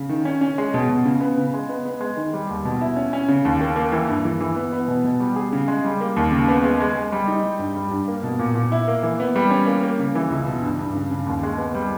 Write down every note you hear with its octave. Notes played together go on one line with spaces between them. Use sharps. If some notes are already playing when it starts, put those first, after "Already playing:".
Already playing: C#3
D#3
C#4
C#4
G#3
B2
B2
C#3
B3
C#3
G#3
B3
B3
G#3
D#3
G3
D#2
B2
E4
C#4
C#4
C#3
D#2
A#3
A#3
E3
G2
E3
E3
B3
B3
B2
B2
G3
G#4
C#3
G#3
G3
A#3
D#2
C#3
B3
G#3
G#3
G#3
G3
D#4
G3
G2
G3
G2
A#3
B2
A#2
A#2
E4
A#3
E3
B3
G3
C#4
A#3
A#3
C#3
E3
C#2
B2
G2
G2
C#3
C#3
D#2
G#3
B3
G3